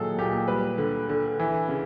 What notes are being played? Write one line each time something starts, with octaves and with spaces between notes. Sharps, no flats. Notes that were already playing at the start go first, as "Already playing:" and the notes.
Already playing: A#2 D#3 F#3 G#4 A4
A#2 G4
G3 B4
D3
D3
E3
C#3